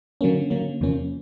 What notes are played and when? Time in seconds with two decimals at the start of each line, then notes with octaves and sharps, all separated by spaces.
0.21 D3 F#3 A#3 C#4
0.50 D3 F#3 A#3 C#4
0.81 E2 C3 F3 A#3 C#4